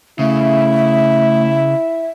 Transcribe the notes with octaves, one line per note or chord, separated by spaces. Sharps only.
C#3 A3 E4 E5